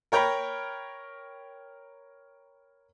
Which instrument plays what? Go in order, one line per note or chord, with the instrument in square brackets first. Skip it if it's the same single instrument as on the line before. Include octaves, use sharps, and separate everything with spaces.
[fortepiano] A#4 C#5 G5 A#5 B5